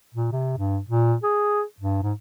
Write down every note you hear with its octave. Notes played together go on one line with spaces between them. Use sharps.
A#2
C3
G2
A#2
G#4
G2
G#2